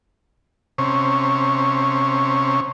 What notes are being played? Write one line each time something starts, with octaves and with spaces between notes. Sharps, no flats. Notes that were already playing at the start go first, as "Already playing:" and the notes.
C3 C#4